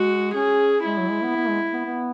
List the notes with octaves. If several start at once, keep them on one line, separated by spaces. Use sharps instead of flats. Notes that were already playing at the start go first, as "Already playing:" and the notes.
Already playing: G#3 F#4
C#4 G#4
G#3 E4
F#3
G#3
B3
B3
G#3
B3
B3